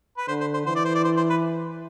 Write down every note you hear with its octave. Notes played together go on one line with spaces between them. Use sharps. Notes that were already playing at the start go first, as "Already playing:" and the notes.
B4
D3 C5
C5
C5
E3 C5
D5
C5
D5
C5
C5
B4